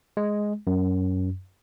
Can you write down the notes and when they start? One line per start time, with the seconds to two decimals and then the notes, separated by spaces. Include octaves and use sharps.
0.17 G#3
0.67 F#2